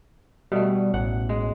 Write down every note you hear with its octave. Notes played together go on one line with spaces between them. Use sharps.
B2 G3 A3
A1 F#5
G#3